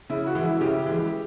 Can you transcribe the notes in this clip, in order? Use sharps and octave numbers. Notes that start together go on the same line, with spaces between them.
C#3 E4
F#4
E3 G#3
E4
C#3 G4
E3 G#3